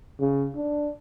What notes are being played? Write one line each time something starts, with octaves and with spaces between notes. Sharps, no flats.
C#3
D4